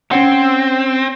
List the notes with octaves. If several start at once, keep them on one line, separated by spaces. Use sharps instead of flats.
C4 C#4 C#5 F#5